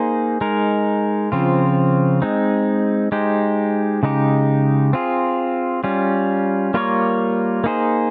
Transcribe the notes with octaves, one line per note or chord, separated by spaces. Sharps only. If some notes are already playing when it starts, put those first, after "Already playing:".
Already playing: A#3 D#4 G#4 C5
G#3 D#4 A#4
C#3 F3 C4 F4
G#3 C4 D#4
G#3 D#4 G4 C5
C#3 G#3 D#4 G4
C4 F4 G#4
G3 C#4 F4
G3 A#3 F4 A#4 C#5
A#3 D#4 G#4 C5